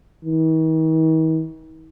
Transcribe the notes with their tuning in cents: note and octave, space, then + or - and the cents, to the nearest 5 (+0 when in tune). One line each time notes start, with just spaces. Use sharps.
D#3 +45